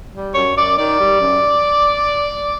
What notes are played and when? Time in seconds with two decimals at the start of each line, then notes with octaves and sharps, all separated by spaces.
0.14 G3
0.34 F#2 C#5
0.56 F#2 D5
0.78 D#3 D5
0.99 G3
1.21 F#2